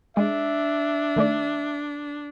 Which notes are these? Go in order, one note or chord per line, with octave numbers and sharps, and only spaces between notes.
G#3 D4 E5
D#3 A3 D5